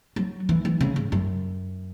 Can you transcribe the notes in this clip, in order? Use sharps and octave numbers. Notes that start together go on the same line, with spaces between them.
F#3
E3
E3
C#3
G#2
F#2